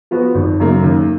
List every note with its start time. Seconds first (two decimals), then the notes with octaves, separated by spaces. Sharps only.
0.11 F3 B3 F#4
0.35 G#1
0.60 F#2 C#3 F#3 A#3
0.83 D#2